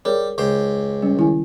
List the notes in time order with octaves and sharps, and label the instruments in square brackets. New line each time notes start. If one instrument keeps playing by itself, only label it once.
[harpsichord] G3 [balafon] G#4 A#4 C#5
[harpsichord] C#2 G4 C5
[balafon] G3 C#4
D#3 E4 G#5